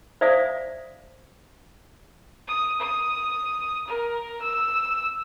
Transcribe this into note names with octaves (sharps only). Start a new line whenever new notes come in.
C5 D5 E5 F5 D#6
D#6
D#6
A#4
E6